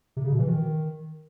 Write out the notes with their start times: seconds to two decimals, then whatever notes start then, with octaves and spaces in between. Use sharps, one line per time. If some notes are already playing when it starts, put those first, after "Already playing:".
0.17 C3
0.24 C#3
0.32 B2
0.40 E3
0.47 D#3